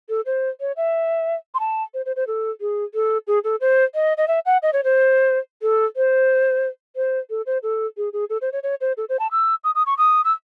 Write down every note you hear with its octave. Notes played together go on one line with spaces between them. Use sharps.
A4
C5
C#5
E5
C6
A5
C5
C5
C5
A4
G#4
A4
G#4
A4
C5
D#5
D#5
E5
F#5
D#5
C#5
C5
A4
C5
C5
A4
C5
A4
G#4
G#4
A4
C5
C#5
C#5
C5
A4
C5
A5
E6
D#6
D#6
C#6
D#6
E6